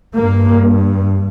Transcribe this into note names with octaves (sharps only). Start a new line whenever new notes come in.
G2 A#3